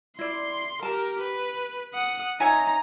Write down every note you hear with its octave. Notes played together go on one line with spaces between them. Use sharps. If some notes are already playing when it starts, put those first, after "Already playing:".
E4 D5 C6
G4 A#4 A5
B4
F#5 D#6
D#4 C#5 E5 G#5 A#5